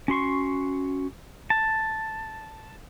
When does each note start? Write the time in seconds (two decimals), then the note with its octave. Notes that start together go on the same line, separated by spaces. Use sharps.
0.08 C#4 F#4 C6 C#6
1.50 A5